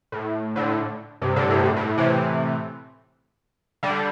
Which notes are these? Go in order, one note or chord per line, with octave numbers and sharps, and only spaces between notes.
A2
A2 D3
G2 C3
A2 D3
G2 C3
G2
A2
A2
C3 E3
D3 G3